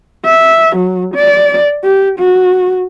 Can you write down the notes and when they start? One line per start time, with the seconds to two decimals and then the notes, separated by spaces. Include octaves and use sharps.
0.25 E5
0.76 F#3
1.15 D5
1.84 G4
2.19 F#4